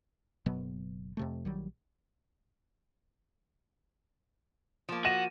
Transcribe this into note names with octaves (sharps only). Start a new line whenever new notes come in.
F#1 B2 F#3 B3
F2 C3 A3
A#1 D#3 F#3 G3
F3 A#3
F#4 A#6 D#7 E7